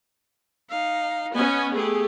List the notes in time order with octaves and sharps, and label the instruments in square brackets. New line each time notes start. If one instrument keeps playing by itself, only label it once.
[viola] D#4 F5
[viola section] B3 C#4 [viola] D#5 G#5
[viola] A3 G4 [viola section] G#4